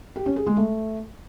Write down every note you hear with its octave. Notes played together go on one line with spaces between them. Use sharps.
G4
C#4
G#4
G#3
A3